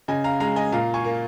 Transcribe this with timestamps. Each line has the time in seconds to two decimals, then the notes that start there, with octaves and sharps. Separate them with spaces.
0.08 C#3 D#5 G#5
0.24 F5 A#5
0.40 G#3 F5 A#5
0.56 D#5 G#5
0.72 A#2 F5 A#5
0.94 G#5 C#6
1.05 A#3